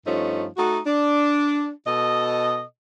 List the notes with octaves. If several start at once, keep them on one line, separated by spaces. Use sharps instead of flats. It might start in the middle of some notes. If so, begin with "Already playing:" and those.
G2 F3 A3 C#4 D#4
A3 D#4 F#4
D4
B2 A4 D#5